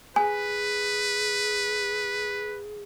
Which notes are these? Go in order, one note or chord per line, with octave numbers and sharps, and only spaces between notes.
G#4 B4 G#5